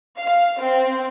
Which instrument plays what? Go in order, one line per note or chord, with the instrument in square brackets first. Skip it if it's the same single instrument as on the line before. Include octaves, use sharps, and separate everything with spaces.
[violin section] F5
C4